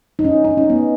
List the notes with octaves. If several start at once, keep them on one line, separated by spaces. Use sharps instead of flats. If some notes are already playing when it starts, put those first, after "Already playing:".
D#4
C#4
D#4
C#4
B3